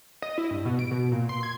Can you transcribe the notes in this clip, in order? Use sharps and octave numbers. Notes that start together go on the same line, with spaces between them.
D#5
E4
G2
B2
D7
B2
A#2
C6
G#6